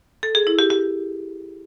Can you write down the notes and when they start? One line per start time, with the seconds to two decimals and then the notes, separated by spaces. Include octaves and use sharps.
0.23 A4
0.35 G#4
0.47 E4
0.59 G4
0.70 G4